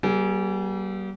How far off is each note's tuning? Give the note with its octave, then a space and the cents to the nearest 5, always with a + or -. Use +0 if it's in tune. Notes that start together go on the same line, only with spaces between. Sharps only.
G3 -35 A#3 +35 G#4 +0